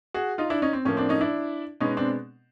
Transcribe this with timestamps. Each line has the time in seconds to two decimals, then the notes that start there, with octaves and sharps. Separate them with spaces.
0.14 F#4 G#4
0.38 D#4 F4
0.50 D4 E4
0.62 C#4 D#4
0.73 C4
0.85 A2 F3 A#3 C#4
0.97 C4 D4
1.09 C#4 D#4
1.21 D4 E4
1.80 B2 G#3 B3 C#4 D#4
1.97 C4 D4